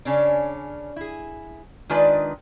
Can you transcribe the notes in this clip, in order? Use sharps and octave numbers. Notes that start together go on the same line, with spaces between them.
C#3 C#4 D4
E4 G#4
D#3 G#3 D4 F4 B4 D5